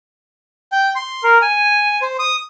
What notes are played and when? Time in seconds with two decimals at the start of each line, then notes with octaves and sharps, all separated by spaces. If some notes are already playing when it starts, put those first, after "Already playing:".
0.72 G5
0.96 C6
1.23 A#4
1.42 G#5
2.02 C5
2.19 D#6